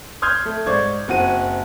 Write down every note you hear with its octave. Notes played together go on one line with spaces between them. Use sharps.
C6 D#6 F6 G6 G#6
A3
G#2 C5 D5 C#6 G#6
F#1 C4 F#4 D#7